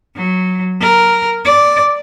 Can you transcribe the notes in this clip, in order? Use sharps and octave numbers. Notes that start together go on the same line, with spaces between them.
F#3
A#4
D5